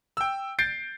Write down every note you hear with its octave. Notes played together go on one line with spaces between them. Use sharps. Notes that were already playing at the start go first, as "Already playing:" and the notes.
G5 E6
G6 A6 C7 D7